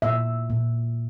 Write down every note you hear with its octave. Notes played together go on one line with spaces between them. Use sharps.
A#2 E5
A#2